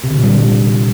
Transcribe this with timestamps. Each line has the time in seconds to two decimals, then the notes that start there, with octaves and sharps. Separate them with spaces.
0.04 C3
0.10 D3
0.17 A#2
0.24 G3